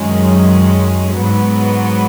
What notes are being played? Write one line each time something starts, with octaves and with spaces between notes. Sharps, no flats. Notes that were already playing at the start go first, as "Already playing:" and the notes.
Already playing: F#2 D#3 G#3 C#4
G#2 F#3 B3